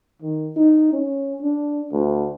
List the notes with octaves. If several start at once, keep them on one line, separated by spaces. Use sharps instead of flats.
D#3
D#4
C#4
D4
D2